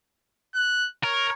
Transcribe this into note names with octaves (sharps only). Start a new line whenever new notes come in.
F#6
A#4 C#5